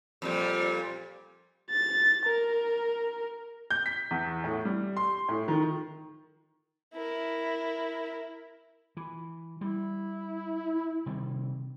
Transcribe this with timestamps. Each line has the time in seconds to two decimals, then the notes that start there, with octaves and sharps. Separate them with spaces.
0.22 F2 A#2 G3
1.70 A6
2.26 A#4
3.70 G6
3.86 B6
4.11 E2
4.44 A2
4.65 G3
4.97 C6
5.29 A2
5.48 D#3
6.94 E4 A#4
8.97 E3
9.61 G3 E4
11.06 C3 D#3 G3